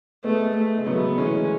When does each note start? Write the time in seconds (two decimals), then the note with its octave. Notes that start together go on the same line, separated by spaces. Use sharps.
0.24 G#3 A3 B3
0.55 A3
0.78 G#3
0.86 F#3 A3 B3
1.18 E3 G#3 C#4